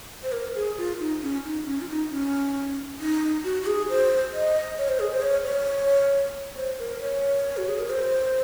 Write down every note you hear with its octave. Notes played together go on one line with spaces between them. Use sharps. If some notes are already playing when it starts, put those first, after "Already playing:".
C5
A#4
G#4
F4
D#4
C#4
D#4
C#4
F4
D#4
C#4
D#4
F#4
F#4
G#4
C5
D#5
C#5
C5
G#4
C5
C#5
C#5
C5
A#4
C#5
F#4
G#4
A#4
C5